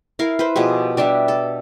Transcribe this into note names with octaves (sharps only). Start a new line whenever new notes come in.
E4 A#4 F5
B4 C5
B2 F3 G4 G#4
G3 D4 G4 E5
A4